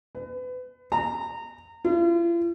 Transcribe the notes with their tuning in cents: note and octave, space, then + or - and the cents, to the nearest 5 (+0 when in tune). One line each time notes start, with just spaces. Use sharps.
B4 +30
A#5 -25
F4 -45